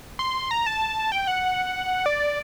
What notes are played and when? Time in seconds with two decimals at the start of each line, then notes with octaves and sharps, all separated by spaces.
0.19 C6
0.51 A#5
0.66 A5
1.12 G5
1.27 F#5
2.06 D5